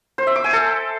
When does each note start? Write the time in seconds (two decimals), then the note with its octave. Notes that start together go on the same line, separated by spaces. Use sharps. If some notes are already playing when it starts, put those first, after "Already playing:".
0.18 C5
0.27 E5
0.36 D6
0.44 G#5
0.53 A4